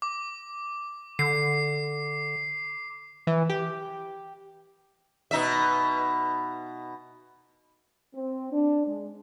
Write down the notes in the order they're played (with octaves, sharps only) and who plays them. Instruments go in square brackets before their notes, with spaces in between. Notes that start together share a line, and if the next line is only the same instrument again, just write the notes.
[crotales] D6
[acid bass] D3 [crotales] C7
[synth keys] E3
G4
[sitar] B2 D#4 E5
[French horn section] C4
D4
G#3